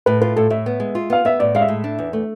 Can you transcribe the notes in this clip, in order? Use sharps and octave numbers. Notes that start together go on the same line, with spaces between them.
A2 B4
F4 B4
A2 A4
A2 E5
B3
G#3
F4
B3 F5
B3 E5
A2 D5
G#3 F5
E5
A2
D4
E2
A3